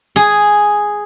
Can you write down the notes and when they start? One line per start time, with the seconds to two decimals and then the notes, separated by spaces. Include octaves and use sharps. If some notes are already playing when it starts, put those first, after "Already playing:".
0.16 G#4